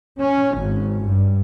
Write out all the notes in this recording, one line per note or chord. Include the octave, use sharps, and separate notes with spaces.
C#4
G#1
G2